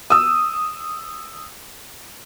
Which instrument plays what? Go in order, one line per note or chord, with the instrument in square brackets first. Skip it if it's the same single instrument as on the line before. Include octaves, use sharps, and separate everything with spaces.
[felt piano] D#6 E6